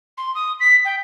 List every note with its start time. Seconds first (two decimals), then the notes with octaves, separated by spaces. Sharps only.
0.17 C6
0.34 D#6
0.60 B6
0.84 G5